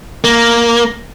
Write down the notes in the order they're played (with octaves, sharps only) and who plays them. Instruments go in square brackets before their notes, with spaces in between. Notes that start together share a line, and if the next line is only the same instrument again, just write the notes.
[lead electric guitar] A#3